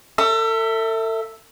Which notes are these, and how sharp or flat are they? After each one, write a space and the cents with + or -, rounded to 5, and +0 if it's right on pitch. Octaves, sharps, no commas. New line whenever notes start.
A4 +35 E5 -5